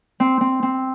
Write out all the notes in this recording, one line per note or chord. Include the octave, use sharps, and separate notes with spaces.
C4
C4
C4